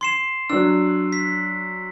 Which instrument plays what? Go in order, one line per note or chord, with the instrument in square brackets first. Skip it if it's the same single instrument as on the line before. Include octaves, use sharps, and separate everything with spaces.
[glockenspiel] C6 C7 E7
[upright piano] F#3 D4 [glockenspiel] E6
[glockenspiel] B6